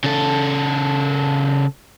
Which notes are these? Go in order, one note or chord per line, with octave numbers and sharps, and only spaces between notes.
C#3 A4